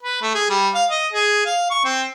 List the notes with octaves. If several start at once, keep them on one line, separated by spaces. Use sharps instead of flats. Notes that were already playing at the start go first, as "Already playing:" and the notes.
B4
A3
G#4
G3
F5
D#5
G#4
F5
C#6
C4